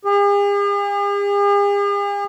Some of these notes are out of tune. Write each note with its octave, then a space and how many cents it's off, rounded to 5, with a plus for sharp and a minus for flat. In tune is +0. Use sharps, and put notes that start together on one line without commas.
G#4 -45